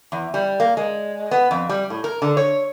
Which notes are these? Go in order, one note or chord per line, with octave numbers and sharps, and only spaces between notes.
E2
G3
A#3
G#3
B3
F2
G3
A2
A#4
D3
C#5